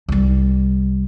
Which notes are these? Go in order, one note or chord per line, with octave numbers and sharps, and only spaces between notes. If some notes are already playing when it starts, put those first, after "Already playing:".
C2 G3